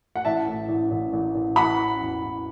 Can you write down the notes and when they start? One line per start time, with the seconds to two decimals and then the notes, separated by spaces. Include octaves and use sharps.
0.16 F#5
0.25 A1 E5 A5
0.48 A2
0.68 A1
0.91 A1
1.13 A1
1.35 A1
1.56 E3 F#5 B5
1.79 C#4
2.01 E2
2.22 E2